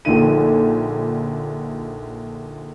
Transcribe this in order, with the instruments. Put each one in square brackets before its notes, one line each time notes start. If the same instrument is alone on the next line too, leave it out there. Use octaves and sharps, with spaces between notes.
[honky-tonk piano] A#1 A#2 D3 D#4 D#7